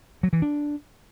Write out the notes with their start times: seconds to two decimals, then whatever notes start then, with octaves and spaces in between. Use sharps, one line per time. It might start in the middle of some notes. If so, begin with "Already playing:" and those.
0.23 F#3
0.33 E3
0.42 D4